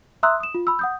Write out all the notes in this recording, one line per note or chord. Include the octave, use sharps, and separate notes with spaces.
E5 A#5 C6 D#6 E6 F#6
D#6 E7
F4
B5 E6
F#5 D#6 G6